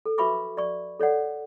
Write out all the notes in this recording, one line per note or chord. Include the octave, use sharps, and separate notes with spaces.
A4
F#4 B4 E5 B5 C#6 D6
D5 C#6
A4 C#5 D5 F#5